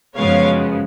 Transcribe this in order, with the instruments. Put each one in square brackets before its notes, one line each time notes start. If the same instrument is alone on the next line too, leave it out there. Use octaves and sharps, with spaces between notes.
[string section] F#2 C#3 F3 G#3 B3 C#5 F5